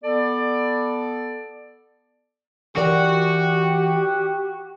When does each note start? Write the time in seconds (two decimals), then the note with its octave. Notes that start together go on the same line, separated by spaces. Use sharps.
0.03 B3 A4 D5
2.76 E3 F#4 G4 A#4 D5